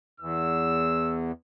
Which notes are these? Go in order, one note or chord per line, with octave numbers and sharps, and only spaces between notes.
E2 E6